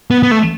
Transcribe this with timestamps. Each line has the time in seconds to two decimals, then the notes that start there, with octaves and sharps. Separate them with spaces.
0.11 B3
0.23 B3
0.31 A3